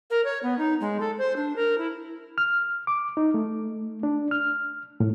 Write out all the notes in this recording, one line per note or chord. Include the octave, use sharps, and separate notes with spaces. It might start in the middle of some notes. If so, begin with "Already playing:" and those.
A#4
C#5
B3
D#4
G#3
A4
C5
D4
A#4
E4
F6
D6
D#4
A3
D4
F6
A2